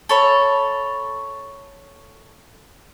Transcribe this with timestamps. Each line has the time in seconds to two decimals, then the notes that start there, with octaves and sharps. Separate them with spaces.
0.09 A4 C#5 B5